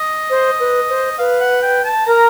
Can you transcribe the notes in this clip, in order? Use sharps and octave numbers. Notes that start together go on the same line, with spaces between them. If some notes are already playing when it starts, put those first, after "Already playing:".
Already playing: D#5
C5
B4
C5
B4 F5
F#5
G5
A5
A#4 A#5